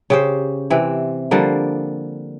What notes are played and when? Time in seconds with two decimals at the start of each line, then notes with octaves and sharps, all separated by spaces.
0.10 C#3 G4 C5
0.70 C3 E3 C4
1.31 D3 F3 G3 A#3